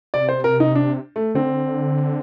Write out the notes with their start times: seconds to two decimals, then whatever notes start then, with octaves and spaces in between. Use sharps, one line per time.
0.14 C3 D5
0.29 C5
0.44 A#4
0.60 D#4
0.75 D4
1.16 A3
1.35 D3 C4